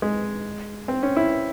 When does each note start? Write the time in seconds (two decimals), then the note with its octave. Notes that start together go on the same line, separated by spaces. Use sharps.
0.02 G#3
0.88 C4
1.03 C#4
1.16 E4